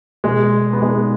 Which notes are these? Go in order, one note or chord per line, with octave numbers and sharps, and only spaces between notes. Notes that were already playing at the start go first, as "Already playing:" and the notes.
B2 G#3
G#4
B3
G#3 D#4